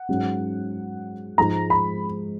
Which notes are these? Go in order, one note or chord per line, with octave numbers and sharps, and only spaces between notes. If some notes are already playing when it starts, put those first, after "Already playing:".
Already playing: F#5
G#2 F#3 C#4
G#2 F3 G#3 D#4 A#5
B5